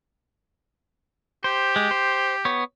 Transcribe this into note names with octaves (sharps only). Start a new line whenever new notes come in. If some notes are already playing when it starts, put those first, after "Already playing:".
G4 C5
G#3
C5
B3 C#5